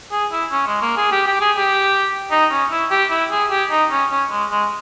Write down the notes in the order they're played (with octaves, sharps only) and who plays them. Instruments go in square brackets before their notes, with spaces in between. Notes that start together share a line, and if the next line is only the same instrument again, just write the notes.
[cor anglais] G#4
E4
C#4
G#3
A#3
G#4
G4
G4
G#4
G4
D#4
C#4
E4
G4
E4
G#4
G4
D#4
C#4
C#4
G#3
G#3